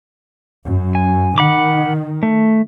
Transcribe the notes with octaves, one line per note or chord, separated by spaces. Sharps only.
F#2
G#5
D#3 F#5 B5 D6
A3